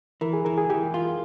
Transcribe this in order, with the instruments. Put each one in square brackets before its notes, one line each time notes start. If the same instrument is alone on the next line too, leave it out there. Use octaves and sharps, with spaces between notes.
[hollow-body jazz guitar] E3 [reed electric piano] A#4
[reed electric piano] G#4
[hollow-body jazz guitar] E3 [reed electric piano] A#4
[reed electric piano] G#4
[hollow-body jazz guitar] E3 [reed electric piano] G4
[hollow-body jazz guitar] F4